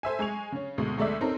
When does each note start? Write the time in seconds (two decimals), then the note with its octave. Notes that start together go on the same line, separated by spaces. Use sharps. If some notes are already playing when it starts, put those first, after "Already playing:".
0.03 A4 C5 E5 G#5
0.19 G#3 G#5 C#6 F7
0.52 C#3 C#4
0.78 D2 B2 G#3
0.97 D2 G#3 A3 D5 E5
1.21 C4 C#4 D#4 A4 A#4